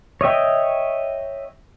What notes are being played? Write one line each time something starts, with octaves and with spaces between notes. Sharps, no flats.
C#5 D#5 E5 G5